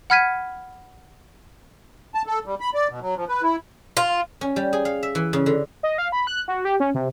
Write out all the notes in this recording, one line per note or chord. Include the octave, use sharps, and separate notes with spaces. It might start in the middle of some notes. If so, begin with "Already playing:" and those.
F#5 B5 F6 G#6 B6 D#7
A5
A4
G3
B5
D5
B2
F#3
F3
B4
E4
F4
C#4
G3
G#4
F5
E5
E3
C#3
D3
D#5
F5
B5
F#6
F#4
G4
C#4
C3